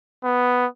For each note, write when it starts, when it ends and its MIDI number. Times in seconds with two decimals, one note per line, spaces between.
0.24 0.66 59